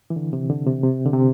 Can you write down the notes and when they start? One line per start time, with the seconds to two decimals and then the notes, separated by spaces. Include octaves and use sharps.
0.10 E3
0.16 D3
0.33 C3
0.50 D3
0.67 C3
0.83 C3
1.06 D3
1.13 C3